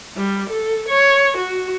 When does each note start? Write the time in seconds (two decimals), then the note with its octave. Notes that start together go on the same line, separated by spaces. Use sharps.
0.17 G3
0.50 A4
0.88 C#5
1.37 F#4